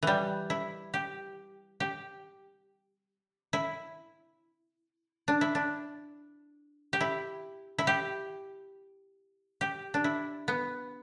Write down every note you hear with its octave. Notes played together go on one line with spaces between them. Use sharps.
E3 G3
E4
G4
G4
E4
D4
E4
D4
G4
E4
E4
G4
G4
D4
E4
B3